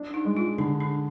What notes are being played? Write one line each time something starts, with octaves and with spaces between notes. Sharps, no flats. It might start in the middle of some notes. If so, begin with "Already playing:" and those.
Already playing: D4
D#4
G#3
F4
D3 D4
D4